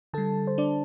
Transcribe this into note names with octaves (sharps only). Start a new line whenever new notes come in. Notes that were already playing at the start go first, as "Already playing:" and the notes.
D3 G3 A4 A5
C5
D4 D5